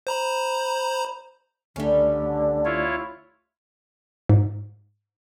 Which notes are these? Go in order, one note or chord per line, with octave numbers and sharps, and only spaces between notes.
C5 A#5 B5
C#2 D3 G3 A3 C#4
E4 F4 C#5
G#2